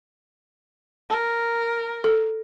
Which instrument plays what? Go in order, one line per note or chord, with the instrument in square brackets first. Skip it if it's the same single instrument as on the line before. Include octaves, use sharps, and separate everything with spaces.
[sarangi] A#4
[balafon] A4